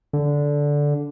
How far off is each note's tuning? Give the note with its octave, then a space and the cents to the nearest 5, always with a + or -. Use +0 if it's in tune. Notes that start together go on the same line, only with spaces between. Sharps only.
D3 -10